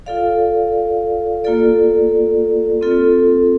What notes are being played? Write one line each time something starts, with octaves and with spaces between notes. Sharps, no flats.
F4 A4 D5 F5
A#3 F4 A4 D5
C4 F4 A4